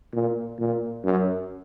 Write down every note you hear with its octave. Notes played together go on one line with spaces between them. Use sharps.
A#2
A#2
F#2